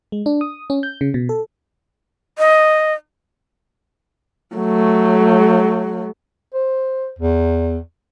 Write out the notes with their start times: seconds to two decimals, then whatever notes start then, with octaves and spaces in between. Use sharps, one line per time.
0.12 G#3
0.26 D4
0.41 D#6
0.70 C#4
0.83 G6
1.01 C#3
1.14 B2
1.29 A4
2.39 D#5
4.56 F#3 A3
6.54 C5
7.19 E2